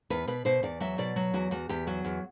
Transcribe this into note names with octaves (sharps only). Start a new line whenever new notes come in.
E2 B4
B2 B4
B2 C5
E2 D5
F#3 E5
B2 D5
F#3
E2 F#4
E2 F#4
E2 G4
F#3 F#4
E2